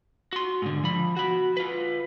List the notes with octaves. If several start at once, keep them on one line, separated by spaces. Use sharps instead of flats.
F#4 C6
G#2 D3
F3 B5
F#4 B5
F4 B4